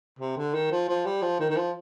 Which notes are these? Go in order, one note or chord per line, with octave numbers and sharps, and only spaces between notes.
C3
D3
D#3
F3
F3
G3
F3
D#3
D#3
F3